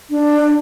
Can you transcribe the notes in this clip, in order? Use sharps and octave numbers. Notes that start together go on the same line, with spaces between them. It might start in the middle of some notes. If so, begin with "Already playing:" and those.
D4